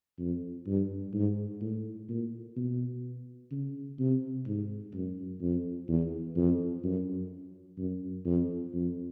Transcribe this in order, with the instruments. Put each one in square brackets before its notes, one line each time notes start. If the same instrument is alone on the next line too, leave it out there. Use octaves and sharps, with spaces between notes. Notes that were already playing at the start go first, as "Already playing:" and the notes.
[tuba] F2
G2
G#2
A2
A#2
B2
C#3
C3
G#2
F#2
F2
E2
F2
F#2
F#2
F2
F2